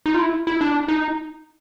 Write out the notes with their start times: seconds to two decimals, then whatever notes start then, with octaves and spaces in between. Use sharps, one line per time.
0.06 D#4
0.14 F4
0.20 E4
0.47 E4
0.61 D4
0.88 D#4